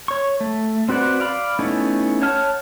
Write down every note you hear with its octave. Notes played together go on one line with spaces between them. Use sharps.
C#5 C#6
A3
C4 F#4 B4 D5 F#5
D5 F5 B5
A3 B3 C#4 D#4 E4
C#5 F#5 A5 F6